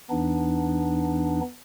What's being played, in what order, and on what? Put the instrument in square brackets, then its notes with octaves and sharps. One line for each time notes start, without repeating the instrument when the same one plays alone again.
[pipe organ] E2 E3 B3 D4 D#4